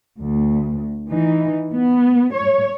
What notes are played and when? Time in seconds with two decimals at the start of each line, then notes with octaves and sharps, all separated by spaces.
0.19 D2
1.10 E3 D#4
1.72 B3
2.33 C#5